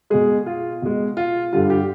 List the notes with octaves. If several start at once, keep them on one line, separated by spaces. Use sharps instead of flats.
B2 G#3 G#4
F4
B2 G#3
F4
G2 D3 G3 F4
G4